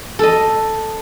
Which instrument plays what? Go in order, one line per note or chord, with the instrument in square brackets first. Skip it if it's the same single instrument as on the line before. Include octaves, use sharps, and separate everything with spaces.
[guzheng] A4 D#5